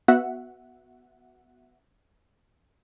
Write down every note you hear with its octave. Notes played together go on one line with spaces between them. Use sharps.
B3 F#4 E5 F#5